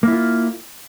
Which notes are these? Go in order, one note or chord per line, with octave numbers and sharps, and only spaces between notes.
A#3 E4 F4